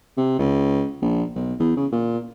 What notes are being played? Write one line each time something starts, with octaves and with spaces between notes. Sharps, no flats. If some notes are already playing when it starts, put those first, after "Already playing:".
C3
C#2
A#1
B1
E2
C#3
A#2